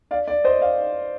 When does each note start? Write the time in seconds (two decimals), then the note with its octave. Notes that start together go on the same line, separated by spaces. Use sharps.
0.11 D5 F5
0.28 D5
0.44 C5 D#5
0.61 D5 F5